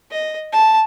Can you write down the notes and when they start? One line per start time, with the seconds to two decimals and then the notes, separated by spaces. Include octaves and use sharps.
0.11 D#5
0.52 A5